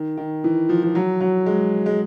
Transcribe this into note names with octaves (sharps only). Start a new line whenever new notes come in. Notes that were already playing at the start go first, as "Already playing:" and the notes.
Already playing: D#3
D#3
E3
F3
F3
F#3
F#3
G#3
G#3